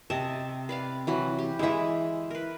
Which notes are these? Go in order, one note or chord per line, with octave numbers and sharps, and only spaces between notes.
C3 D#5 E5 A5
B4 D5 F5
E3 F#3 B4
G4
E3 G#3 E4 E5
A#4 B4